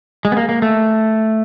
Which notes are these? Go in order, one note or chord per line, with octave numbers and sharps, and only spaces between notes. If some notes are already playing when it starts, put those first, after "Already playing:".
G#3
B3
A#3
A#3
A3